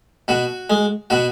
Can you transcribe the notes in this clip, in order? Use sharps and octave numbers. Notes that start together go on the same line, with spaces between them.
B2 F#4
G#3
B2 F#4